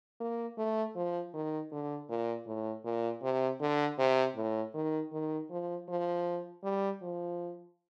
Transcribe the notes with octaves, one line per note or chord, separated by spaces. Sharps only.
A#3
A3
F3
D#3
D3
A#2
A2
A#2
C3
D3
C3
A2
D#3
D#3
F3
F3
G3
F3